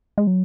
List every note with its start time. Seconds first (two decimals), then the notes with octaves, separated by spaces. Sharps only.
0.18 G#3
0.27 F#3